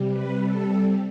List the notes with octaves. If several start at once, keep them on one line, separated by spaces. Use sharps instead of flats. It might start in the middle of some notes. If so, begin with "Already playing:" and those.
Already playing: C3 G3
B4
A4